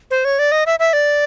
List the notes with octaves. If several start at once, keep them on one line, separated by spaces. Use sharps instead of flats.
C5
C#5
D5
D#5
E5
E5
D5